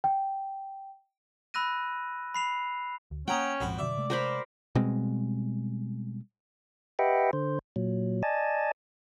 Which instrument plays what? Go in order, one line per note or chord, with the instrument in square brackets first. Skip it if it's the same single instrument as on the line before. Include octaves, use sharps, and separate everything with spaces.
[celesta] G5
[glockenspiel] B5 E6 F#6 A#6 D#7
B5 C7 F7
[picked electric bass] D2
[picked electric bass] G#3 A#3 [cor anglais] C#4 [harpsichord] F#5 A#5 D#6 [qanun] G5
[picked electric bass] A#1 G#2 [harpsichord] F2 F#4 B5
[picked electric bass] B2 D3 F#3 [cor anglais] D5 [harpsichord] E5
[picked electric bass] C3 G#3 A3
[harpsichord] F#4 [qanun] A#4 C5 B5
[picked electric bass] B2 G3 G#3 C4
[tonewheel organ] G4 B4 D#5 E5 F#5 G5
D3 C5
A#2 F#3
D5 D#5 G#5 A5